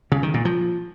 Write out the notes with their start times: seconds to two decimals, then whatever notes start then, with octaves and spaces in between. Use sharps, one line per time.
0.12 C#3
0.23 D#3
0.34 A#2
0.45 F3